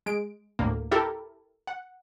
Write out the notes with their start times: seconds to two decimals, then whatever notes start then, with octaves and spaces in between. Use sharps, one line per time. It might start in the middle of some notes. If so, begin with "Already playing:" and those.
0.06 G#3 D7
0.59 D2 A2 A#3
0.91 E4 G4 A4 A#4
1.67 F#5